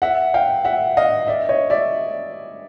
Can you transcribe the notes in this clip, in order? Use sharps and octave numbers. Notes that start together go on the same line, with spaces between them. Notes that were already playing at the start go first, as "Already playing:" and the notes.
E5 F#5
F5 G5
E5 F#5
D#5 F5
D5 E5
C#5 D#5
D5 E5